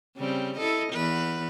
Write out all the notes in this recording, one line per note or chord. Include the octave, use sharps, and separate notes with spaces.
C#3 G3 C4
E4 A4 D#5
E2 B4